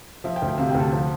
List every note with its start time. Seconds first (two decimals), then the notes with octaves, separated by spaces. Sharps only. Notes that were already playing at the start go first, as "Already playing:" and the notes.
0.24 F3 E5
0.36 G5
0.42 D2
0.58 C3 F5
0.69 G5
0.75 D2
0.80 A5
0.92 F3